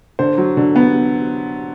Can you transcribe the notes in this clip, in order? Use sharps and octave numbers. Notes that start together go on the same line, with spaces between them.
D3 C5
F#3
D3
B3